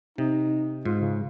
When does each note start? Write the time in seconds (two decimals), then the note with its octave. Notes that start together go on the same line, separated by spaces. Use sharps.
0.18 C3 D#4
0.85 G#2 F4
1.01 C#3